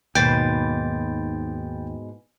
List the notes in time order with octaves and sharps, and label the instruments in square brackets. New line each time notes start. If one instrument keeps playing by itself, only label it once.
[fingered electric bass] D#2 [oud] G#2 B2 [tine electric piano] G5 A6